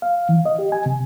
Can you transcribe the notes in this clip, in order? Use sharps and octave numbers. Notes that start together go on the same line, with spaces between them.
F5
E3
D#5
G4
G#5
C3